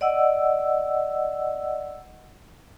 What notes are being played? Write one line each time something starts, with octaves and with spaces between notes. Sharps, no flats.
D5 D#5 F#5 E6